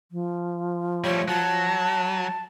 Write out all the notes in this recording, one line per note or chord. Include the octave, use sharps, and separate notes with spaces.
F3
G3 A3 C#5
F#3 A5